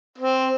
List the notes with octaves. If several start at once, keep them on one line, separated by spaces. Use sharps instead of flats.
C4